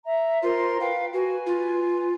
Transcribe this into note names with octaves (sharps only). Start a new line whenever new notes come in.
E5 A#5
F4 A#4 C5 C6
B4 F5 G5
F#4 B4 G#5
F4